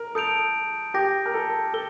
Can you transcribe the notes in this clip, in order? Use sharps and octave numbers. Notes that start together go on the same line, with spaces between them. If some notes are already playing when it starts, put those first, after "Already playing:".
Already playing: A#4
A4 D#6 G6 D7 F7
G4 D6 G6 A#6
A#4
A4
A4 G7